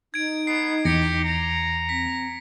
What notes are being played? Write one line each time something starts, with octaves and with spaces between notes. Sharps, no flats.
D#4 G#6 D7
B3 C7
E2 G4 A#6 C#7
A#5
C4 B6